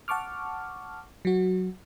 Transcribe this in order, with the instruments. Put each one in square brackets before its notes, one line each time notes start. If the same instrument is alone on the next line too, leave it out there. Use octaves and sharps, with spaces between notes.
[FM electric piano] F#5 A5 C#6 D6 F6
F#3 F#4